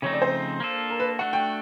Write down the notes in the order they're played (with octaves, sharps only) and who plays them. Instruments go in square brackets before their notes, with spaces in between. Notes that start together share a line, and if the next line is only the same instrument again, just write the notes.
[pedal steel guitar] C#3 F3 A3 C4 D#4 [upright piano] C#5
[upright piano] D5
C5
[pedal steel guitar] A#3 D4 F4 A4
[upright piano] A#4
B4
[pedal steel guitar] A3 D4 F#4 [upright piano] F#5
[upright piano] G5